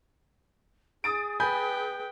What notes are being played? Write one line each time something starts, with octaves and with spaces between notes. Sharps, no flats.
G#4 D#6 A6 D7
B4 G5 G#5 B5 G6